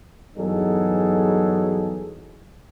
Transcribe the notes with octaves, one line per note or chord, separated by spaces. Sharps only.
E2 G2 F#3 D#4 G#4 A4